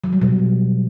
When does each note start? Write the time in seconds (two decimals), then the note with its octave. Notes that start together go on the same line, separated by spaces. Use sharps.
0.04 F#3
0.13 G3
0.22 B2